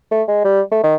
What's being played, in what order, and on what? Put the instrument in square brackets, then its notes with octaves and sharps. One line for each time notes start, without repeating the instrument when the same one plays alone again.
[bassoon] A3
G#3
G3
A3
D#3